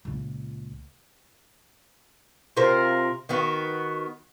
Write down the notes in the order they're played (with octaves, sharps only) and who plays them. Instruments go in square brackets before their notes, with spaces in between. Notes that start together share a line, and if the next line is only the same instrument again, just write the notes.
[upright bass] C#2 A#2
[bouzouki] C3 F4 A#4 C5
D#3 B3 F#4